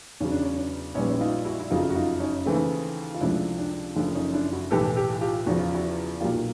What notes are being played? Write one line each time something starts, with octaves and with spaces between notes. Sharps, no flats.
E2 C#3 F#3 C#4
D4
C#4
D4
A#1 A#2 G3 B3 C#4 D#4
E4
D#4 F4
E4 F#4
E4
F#1 F2 C#3 F#3 D#4 F4
F#4
D#4 F4
C#4 D#4
D#2 C#3 E3 A3 C4
F4
C#2 C3 F3 A3 D4 E4
D4
F#1 F#2 C#3 F3 A3 D4
C#4 D#4
D4 E4
E4 F#4
B1 A2 E3 G4 A4
G4 A4
F4 G4
E2 C#3 F3 F#4
F4
E4 F#4
B1 A#2 F#3 A#3 F4 G4